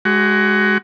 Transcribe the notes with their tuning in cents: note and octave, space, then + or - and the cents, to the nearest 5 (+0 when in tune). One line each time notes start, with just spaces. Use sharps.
G#3 +0 F#4 +20